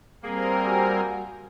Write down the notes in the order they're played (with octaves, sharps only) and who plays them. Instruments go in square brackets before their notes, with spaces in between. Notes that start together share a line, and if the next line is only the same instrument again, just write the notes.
[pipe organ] G3 C4 A#4 [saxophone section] A#3 G#4
[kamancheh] F#4 G#5